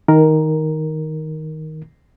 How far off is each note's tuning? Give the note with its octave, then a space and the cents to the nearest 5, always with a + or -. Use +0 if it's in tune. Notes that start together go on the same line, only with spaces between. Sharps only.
D#3 +10 A#4 +0